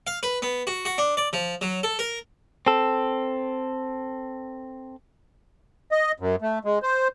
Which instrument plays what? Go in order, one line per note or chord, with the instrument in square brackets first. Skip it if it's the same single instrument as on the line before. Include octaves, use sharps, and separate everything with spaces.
[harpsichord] F5
B4
B3
F#4
F#4
D4
D5
F3
F#3
A4
A#4
[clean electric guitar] C4 A4
[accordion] D#5
F#2
A3
G#3
C5